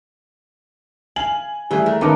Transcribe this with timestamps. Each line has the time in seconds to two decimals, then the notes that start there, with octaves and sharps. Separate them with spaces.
1.16 F5 G#5 F#7
1.71 E3 G3 A3 G#4
1.86 A3 A#4
2.01 D#3 A#3 B3 C#4 D#4 A#4 A5 D6